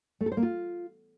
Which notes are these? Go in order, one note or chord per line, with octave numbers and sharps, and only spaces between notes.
A3
A4
C5
A#3
F4